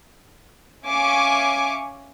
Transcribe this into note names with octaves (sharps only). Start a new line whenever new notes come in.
C#4 E5 F5 G#5 C#6 D6